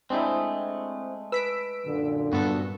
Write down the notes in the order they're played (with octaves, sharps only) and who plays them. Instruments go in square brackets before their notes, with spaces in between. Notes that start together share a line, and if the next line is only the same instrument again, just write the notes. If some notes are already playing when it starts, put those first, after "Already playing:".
[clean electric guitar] G#3 A3 [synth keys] C4 D4 E4
[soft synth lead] B4 [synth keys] E6 B6 D7
[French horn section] F#2 A#2 D3
[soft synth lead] G2 [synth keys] B3 [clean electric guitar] F#4 A4